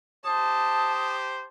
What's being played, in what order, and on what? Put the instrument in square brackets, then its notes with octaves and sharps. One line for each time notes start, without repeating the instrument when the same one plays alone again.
[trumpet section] G4 C5 [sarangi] A5 [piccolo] D#6